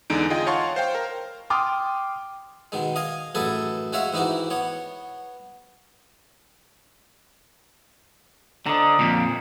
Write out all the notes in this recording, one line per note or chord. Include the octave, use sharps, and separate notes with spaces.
E2 D3 G#3 D#4 D7
F4 G#4 D#5 G5
C#5 F5 F#5 A5 C6 C#6
C5 F5 G5
A#4
G5 C6 D6 D#6 F6
B2 D#3 G#3
D#5 F5 G#5
A1 F#2 G#4 A4 B4 G#5
G#3 F#4 C#5 E5 F5
G#2 E3 D#4 F#4 G4
B3 C#5
D3 D#5 A#5
F2 A#2